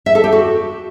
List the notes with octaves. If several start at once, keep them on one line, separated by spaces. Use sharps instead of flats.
E5
A4
G4
F#4